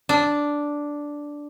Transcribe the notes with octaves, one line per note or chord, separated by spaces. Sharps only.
D4